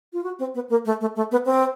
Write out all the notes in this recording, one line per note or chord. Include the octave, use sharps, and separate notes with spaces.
F4
F#4
C4
B3
A#3
A3
A3
A3
B3
C4